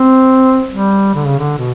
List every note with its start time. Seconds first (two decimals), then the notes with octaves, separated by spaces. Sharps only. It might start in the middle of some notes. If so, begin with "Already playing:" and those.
Already playing: C4
0.70 G3
1.15 D3
1.26 C#3
1.38 D3
1.58 B2